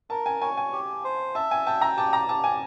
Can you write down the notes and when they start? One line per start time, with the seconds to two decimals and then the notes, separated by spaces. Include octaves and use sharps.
0.10 A#4 A5
0.26 G#5
0.41 C#5 G#5
0.57 G#5
0.73 G4
1.04 C5
1.35 E5 A5
1.51 G#5
1.66 G5 A5
1.81 A#5
1.97 G4 A5
2.13 A#5
2.29 G4 A5
2.44 G#5